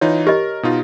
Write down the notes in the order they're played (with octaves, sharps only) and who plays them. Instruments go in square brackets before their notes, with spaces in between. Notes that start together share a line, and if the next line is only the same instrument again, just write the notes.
[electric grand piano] E3 D#4 F4 [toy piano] C#5
[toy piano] G4 D#5 [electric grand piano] A#4
[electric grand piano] B2 D#4 F4